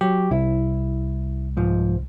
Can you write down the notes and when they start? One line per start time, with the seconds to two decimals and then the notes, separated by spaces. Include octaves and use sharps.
0.01 F#3 G4
0.31 C2 E4
1.57 G#2 F3